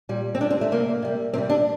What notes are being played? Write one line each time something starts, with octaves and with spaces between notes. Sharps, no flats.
A#2 G3
C4
A#2 G3 D4
C4
A3
C3 G3 A#3
C3 G3
C3 E3 G3 C4
D4